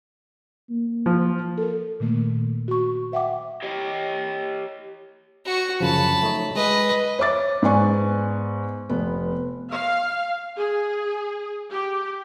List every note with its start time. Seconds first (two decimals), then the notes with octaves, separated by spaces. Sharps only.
0.70 A#3
1.06 F3
1.58 A4 A#4
2.00 A#2 D#3 A3 A#3
2.68 F#4 C#6
3.12 C5 E5 F#5 G5 D6
3.62 G4 C#5 D#5 G5
5.46 F#4 C#6
5.80 F#2 C#3 F3 A5 B5
6.23 A3 D#4 C#5
6.56 G#3 B4 D#5
7.19 C#5 E5 D6 A6
7.62 G#2 B3 D5 G#5 C#6
8.89 F1 B3
9.71 F5
10.57 G#4
11.71 G4